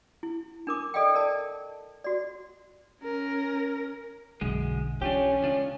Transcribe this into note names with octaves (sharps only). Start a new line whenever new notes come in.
E4
D4 A#4 D6
A4 D5 D#5 F5 G5
A#4 D5 A5
F#4 D5
C#4 A#4
B1 F#2 D3 G#3
E3 C#4 D4 F4 G4
C#2 D4 F4